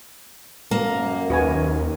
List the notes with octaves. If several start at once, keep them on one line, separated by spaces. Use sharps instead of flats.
F#2 A#3
D#2 F#4 B4 G#5